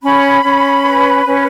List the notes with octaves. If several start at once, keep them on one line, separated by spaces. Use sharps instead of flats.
C#4 B5
C#4
B4
C#4